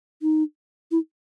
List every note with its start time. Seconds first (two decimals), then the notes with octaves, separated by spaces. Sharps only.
0.22 D#4
0.91 E4